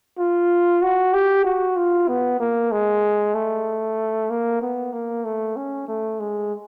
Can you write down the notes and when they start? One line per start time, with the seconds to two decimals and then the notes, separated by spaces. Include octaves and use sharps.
0.18 F4
0.82 F#4
1.13 G4
1.44 F#4
1.76 F4
2.08 B3
2.40 A#3
2.72 G#3
3.35 A3
4.30 A#3
4.61 B3
4.93 A#3
5.24 A3
5.56 C#4
5.88 A3
6.20 G#3